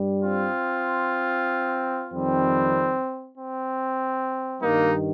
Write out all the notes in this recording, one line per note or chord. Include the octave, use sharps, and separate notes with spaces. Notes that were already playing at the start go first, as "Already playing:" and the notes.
Already playing: G2 G3
C4 F4
F2 D#3 G3 C4
C4
G2 D#3 G3 A#3 D#4